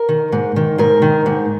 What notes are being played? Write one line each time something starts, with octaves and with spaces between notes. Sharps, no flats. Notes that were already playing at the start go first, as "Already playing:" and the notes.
Already playing: A#4
D#3
G#2
D#3
G#2 A#4
D#3
G#2